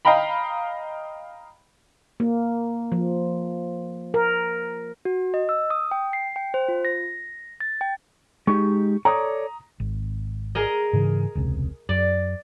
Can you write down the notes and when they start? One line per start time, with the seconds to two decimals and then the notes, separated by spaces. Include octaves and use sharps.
0.05 D#5 F5 G5 A#5 B5
2.20 A#3
2.92 F3
4.14 A#4
5.05 F#4
5.34 D#5
5.49 E6
5.70 D#6
5.91 G5
6.13 C7
6.36 G5
6.54 C5
6.68 F4
6.85 A#6
7.60 A6
7.81 G5
8.47 G#3 D#4 G4 C#6
9.05 A4 C#5 D5 A#5 D#6
9.80 G#1
10.55 G#4 A#4 D#5
10.93 G#2 C#3 E3
11.35 E1 C#2 C3
11.89 F#2 D5